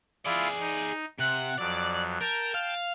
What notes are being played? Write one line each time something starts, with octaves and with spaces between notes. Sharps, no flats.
E4 F4 G#4 D5
D#4
C3 F#5 F#6
F2 F#3 D5
A#4 G5 A5
F5